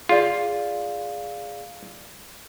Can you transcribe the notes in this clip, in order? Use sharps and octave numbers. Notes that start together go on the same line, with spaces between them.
F4 G#4 D5 F5